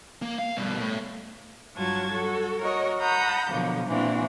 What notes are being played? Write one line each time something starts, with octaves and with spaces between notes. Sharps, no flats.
A#3
F5
G2 B2
A2
G2 F#3 F4 F#4 A5 G#6
F#4 A4
F#4 A#4 C#5 D#5
F#5 A#5 B5 D#6 G6
B2 D3 F3 F#3 A#3
A#2 E3 A#3 C4 D4 F#4